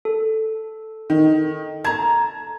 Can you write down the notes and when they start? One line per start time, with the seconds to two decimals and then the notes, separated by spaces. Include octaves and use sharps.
0.05 A4
1.10 D#3
1.84 A5 A#5 G#6